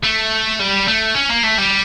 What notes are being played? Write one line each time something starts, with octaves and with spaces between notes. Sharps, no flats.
A3
G3
A3
C#4
A#3
A3
G3